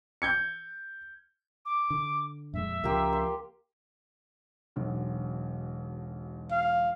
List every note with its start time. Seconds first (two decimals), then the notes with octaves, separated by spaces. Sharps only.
0.22 G6 G#6 C#7
1.66 D6
1.90 D3
2.54 F2 A#2 G#3 E5
2.84 C#2 C#3 F3 A#3 G4 C6
3.13 C6
4.76 E1 B1 D3
6.51 F5